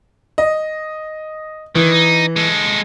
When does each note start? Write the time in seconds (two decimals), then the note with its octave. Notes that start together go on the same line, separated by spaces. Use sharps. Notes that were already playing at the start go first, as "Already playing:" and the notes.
0.38 D#5
1.75 D#3 E3
1.92 D#4
2.36 G#3 A4